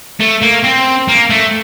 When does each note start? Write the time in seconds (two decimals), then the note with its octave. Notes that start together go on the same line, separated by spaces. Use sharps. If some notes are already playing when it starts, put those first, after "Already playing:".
0.20 A3
0.42 A#3
0.64 C4
1.08 A#3
1.30 A3